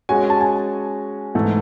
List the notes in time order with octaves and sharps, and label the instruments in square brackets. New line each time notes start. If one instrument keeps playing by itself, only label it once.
[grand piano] G#3 C#4 F#4 [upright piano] G#5
[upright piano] A5
G#5
[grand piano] G#2 E3 A3